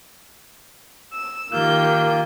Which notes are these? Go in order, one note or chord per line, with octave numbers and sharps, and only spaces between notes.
E6
D#3 A#3 F4 G4 G6